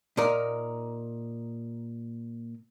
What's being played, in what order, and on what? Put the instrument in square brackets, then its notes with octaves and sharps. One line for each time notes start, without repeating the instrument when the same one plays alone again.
[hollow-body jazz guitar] A#2 D#4 A#4